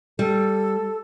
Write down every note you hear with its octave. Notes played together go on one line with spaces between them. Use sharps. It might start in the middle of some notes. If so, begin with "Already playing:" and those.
G3 A4